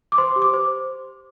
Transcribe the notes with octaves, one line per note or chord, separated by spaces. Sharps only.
D6
C5 C6
G4
D6
C5